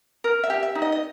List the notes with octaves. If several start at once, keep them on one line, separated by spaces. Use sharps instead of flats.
A#4
E5
G4
E5
D#4
D#5
D#5